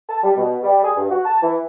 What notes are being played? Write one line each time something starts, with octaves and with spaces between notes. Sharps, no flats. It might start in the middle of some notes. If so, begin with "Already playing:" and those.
A5
G3
B2
G3
G#4
G2
F#4
A5
E3